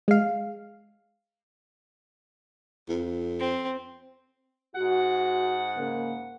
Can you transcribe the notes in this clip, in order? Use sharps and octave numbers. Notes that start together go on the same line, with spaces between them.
G#3 F5
F2
C4
G#2 F#4 F#5
C#3 A#3